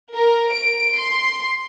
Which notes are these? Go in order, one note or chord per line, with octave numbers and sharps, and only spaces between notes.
A#4
D7
C6